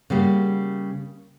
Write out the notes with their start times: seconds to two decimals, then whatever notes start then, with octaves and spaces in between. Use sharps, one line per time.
0.10 C#3 G3 A#3 F#4